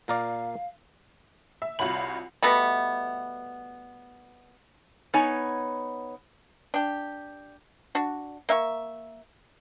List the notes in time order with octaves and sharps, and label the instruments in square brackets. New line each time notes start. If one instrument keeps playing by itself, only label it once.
[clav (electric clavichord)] A#2 A#4 D5 [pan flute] F5
[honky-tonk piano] E5
C2 F4 F#4 C#5 B5 F#7
[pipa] B2 G3 A3 B3
[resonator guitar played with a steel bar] B3 D#4 C#5 G#5
[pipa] D4 G4
D4 F#4
A#3 E5 F5 C#6